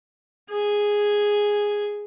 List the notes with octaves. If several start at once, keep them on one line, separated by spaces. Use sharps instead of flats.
G#4 G#5